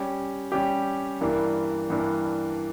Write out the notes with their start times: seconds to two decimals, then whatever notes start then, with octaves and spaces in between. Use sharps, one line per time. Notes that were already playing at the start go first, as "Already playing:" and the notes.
Already playing: G3 C#4 G4
0.52 G3 C#4 G4
1.21 G2 E3 A#3 D4
1.90 G2 E3 A#3 D4